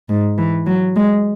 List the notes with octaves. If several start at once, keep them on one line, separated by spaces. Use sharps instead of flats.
G#2
E3
F#3
G#3